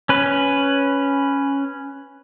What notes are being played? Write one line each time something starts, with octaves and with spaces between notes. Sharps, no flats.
C#4 B4